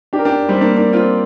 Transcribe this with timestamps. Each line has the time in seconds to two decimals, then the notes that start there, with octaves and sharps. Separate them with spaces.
0.13 D4 G4
0.19 A#4
0.25 D4 G4
0.49 G3 C4
0.61 A#3 D4
0.77 A#3 D4
0.93 C4 F4